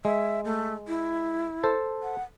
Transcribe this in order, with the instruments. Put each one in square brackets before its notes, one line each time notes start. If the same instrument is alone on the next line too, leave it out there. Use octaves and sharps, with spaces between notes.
[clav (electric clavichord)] G#3 [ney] E5
[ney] A3
E4
[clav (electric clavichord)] A4 C5 A5
[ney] F#5